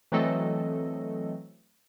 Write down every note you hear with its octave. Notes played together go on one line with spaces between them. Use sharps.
E3 F#3 A3 C4 A4 D#5